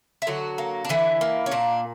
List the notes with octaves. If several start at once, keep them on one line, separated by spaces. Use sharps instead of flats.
E4
D3 F#3 F#4
A#3
D4
D3 E3 E4
A#3
C#4
A#2 D4